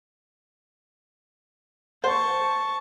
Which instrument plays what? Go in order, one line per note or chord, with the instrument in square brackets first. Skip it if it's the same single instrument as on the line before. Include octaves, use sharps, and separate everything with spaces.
[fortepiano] C5 [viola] A5 C#6